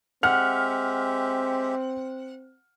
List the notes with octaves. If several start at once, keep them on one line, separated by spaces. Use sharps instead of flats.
G#3 C4 G4 E5 F#5 F6